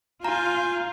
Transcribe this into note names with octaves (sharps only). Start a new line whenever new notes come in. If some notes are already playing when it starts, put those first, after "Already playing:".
F4 G#5 A#5 G6